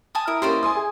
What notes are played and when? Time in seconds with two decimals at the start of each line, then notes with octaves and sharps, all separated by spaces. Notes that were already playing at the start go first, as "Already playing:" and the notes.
0.15 G#5 A5 D#6
0.27 E4 A#4 D#6
0.42 A#3 C#4 G4 C5 D5 D#5
0.63 G#5 C6 D#6
0.77 G#4